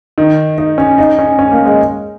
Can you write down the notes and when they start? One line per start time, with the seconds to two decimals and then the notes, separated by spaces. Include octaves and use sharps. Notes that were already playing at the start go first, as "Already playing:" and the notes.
0.18 D#3
0.58 D#4
0.78 C#4
0.98 D#4
1.19 C#4
1.39 C#4
1.52 A#3
1.65 G#3